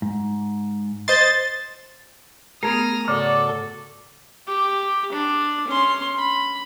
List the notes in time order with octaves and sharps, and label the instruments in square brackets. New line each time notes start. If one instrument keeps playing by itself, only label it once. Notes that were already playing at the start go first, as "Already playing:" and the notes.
[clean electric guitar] G#2
[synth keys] C5 D#5 C6 [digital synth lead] A6
[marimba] A3 B3 [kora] G#4 A#4 [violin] D#6 F6
[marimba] G#2 C#3 [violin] F#4 A4 [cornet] D5
[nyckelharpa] G4
D4
C#4 C6
B5